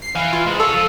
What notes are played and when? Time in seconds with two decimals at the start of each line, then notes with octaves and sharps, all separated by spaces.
0.02 C7
0.15 E3 F5
0.33 F4
0.46 G#2 G#3
0.60 G#4 A4 C#5 E6
0.74 F3